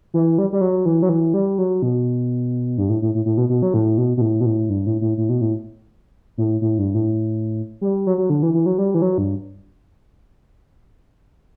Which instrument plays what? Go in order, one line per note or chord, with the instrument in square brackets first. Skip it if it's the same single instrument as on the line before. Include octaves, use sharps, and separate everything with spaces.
[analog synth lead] E3
G3
G3
F#3
E3
F#3
E3
G3
F#3
B2
G2
A2
A2
A2
A2
B2
B2
F#3
A2
B2
B2
A2
B2
A2
G2
A2
A2
A2
B2
A2
A2
A2
G2
A2
G3
F#3
F#3
D3
E3
E3
F#3
G3
E3
F#3
G2